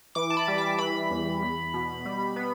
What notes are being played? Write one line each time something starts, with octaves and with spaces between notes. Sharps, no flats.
E3 D6
A5
B5
G3
D6
E3 B5
E2
E2
B2
G3
B3